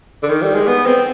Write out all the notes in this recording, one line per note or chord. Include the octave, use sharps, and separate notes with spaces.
D3
D#3
G3
G#3
B3
C4